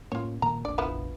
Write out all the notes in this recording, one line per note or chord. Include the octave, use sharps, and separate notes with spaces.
A2 A#3 C#4 F4 C#5
A#2 D#3 A#3 A#5
F1 A#1 D4 D5
F3 B3 E4